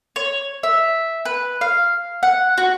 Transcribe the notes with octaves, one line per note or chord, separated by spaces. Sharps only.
C#5
E5
B4
F5
F#5
F#4